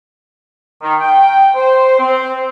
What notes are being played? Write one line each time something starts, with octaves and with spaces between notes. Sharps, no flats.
D#3
G5
C5
C4